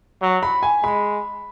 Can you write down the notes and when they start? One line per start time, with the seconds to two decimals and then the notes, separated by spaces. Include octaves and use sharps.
0.22 F#3
0.43 B5
0.63 G#5
0.83 G#3 B5